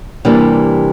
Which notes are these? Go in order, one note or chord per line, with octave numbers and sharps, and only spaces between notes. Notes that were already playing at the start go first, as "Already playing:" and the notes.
C3 E3 G3 A#3 D4